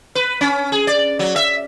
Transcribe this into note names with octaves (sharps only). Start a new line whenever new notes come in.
B4
C#4
G#4
D5
F#3
E5